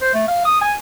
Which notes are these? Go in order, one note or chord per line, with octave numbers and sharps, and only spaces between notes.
C5
A3
F5
D#6
G#5